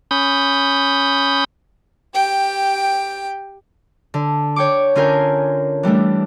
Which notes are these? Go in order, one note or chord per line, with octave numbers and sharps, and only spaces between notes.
C#4 B5 D#6 G6
G4 G5
D3
C#5 G5 C#6 D6
D3 C#4 F4 A#4 G#5 G6
E3 G3 A3 D4